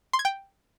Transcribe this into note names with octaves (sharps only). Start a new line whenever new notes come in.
C6
G#6
G5